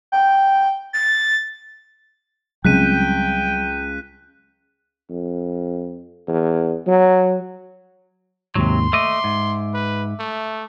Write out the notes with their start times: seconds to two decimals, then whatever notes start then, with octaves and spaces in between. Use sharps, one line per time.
0.12 G5
0.93 A6
2.65 C#2 F#3 G3 C4 G5 F#6 B6 D#7
5.10 F2
6.28 E2
6.87 F#3
8.55 D#2 G#2 C3 F#3 C6
8.93 A3 D#5 E5 D6
9.24 G#2
9.74 B4
10.19 A3